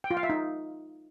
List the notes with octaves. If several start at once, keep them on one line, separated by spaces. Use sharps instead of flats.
G5
F4
F5
E5
D#4